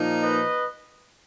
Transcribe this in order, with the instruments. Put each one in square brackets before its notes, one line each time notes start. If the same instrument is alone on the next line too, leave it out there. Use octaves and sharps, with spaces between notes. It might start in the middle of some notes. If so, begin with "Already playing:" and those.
Already playing: [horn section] A#2 F3 A#3 D#4
B4 D#5